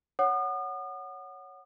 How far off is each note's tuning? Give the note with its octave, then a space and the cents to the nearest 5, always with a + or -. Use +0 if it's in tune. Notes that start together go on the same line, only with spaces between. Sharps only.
C#5 +0 F#5 +0 D#6 -40